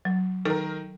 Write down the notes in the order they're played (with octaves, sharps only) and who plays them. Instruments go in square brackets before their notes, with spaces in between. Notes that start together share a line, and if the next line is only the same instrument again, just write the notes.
[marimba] F#3
[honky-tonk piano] D#3 A#4 [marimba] A4